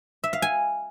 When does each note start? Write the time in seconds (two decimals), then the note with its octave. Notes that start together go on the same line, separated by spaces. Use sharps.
0.24 E5
0.33 F5
0.42 G#5